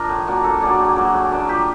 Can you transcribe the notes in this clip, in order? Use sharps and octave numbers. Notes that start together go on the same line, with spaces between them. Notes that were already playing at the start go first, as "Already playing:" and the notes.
Already playing: F3 D4 A#4
A2
F#3 A#3 D4
A2 A4
F#3 A#3 D4 G#4
A2
F#3 A#3 D4
A2
F#3 A#3 D4
F3 G4